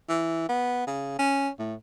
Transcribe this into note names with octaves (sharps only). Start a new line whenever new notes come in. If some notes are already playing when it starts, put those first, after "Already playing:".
E3
B3
C#3
C#4
A2